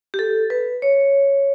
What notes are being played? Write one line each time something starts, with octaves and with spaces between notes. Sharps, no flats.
G4
A4
B4
C#5